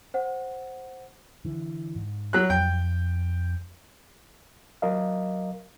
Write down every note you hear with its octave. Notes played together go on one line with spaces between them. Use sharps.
C5 F#5
D3 E3
G#2
F#3 F#6
F2 G5
F#3 A#4 D#5 F5